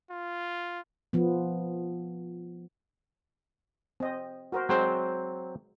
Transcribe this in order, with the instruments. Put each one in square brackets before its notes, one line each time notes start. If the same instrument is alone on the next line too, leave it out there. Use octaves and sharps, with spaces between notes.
[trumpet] F4
[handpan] F3 B3
[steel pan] C4 D#5
F#4 A#4 C5
[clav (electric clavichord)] F#3 C4 C5 [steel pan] G#3